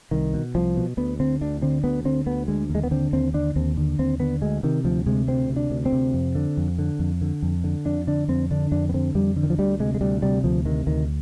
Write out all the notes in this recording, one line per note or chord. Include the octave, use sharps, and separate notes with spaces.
C2 D#3
B2
C2 F3
B2
D2 B3
D3 C4
D2 D4
D3 C4
D2 B3
D3 C4
D2 B3
D3 G#3
D#2
G#3
B3
D3 C4
D#2 C4
D3 D4
D#2 C4
D3
D#2 C4
D3 B3
D2 G#3
C3 D#3
D2 F3
C3 G#3
D2 C4
C3
D4
D2
C4
C3
F2
D3
F2
D3
F2
D3
F2
D3
F2 D4
D3 D4
F2 C4
D3 D4
F2 D4
B3
D3 C4
F2 G3
D3
D#3
F3
D2 G3
C3 G#3
G#3
D2 G3
C3 G3
D2 F3
C3 D#3
D2 D#3